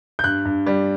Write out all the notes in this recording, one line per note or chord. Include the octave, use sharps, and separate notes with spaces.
G6
G2 F#6
G2
G3